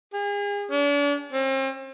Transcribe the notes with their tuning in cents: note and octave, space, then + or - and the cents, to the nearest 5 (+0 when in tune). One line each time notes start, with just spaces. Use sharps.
G#4 -35
D4 -40
C4 +40